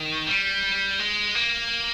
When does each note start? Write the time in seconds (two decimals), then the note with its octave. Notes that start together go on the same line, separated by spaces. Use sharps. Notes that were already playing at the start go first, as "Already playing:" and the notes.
Already playing: D#3
0.27 G3
0.99 G#3
1.35 A#3